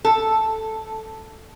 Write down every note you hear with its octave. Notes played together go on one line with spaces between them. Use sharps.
A4